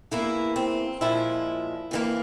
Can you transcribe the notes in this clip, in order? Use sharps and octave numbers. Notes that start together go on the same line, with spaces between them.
E2 E3 A#3 E4
C4
A#2 F3 G#3 E4
F2 E3 G3 A#3